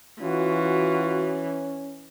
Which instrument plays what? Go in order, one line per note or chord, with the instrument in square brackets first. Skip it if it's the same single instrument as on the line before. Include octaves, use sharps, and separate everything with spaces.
[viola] E3 [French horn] C#4 [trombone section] F4 F#4